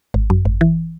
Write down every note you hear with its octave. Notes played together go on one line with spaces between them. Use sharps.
G#1
F#2
G#1
E3